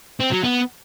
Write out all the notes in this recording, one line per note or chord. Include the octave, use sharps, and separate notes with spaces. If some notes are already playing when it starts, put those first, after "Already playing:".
C4
F#3
B3